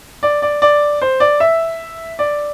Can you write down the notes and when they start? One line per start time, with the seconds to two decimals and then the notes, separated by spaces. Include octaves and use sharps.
0.23 D5
0.42 D5
0.62 D5
1.02 C5
1.20 D5
1.40 E5
2.19 D5